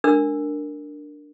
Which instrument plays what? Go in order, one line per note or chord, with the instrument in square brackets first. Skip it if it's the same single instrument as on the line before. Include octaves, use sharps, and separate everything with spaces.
[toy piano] D4 A#4 E6